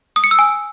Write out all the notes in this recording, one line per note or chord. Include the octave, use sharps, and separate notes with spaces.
D#6
C#7
E6
G#5